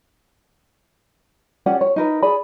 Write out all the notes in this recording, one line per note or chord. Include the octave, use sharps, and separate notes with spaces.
C#4 G4 D5 F#5
C#5
D#4 A#4 B4
G#4 D5 G#5 B5